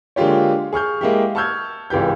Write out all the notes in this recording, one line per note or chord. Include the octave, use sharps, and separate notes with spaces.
D3 G#3 A#3 F4 G4 C#5
G#4 C#6 F6 G6
G#3 A#3 E4 G4
A5 C#6 E6 F6 G6 G#6
G#1 C#2 E3 G4 G6